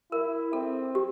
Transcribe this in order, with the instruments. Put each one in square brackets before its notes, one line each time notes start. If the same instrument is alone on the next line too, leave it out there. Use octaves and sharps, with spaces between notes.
[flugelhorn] E4 [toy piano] A#4
[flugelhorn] C4 [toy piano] A4
[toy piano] G4